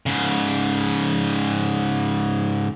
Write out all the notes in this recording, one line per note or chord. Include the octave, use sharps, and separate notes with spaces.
G#2 C#3